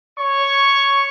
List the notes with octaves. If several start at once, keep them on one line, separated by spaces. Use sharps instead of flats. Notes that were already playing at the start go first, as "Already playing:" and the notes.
C#5 C#6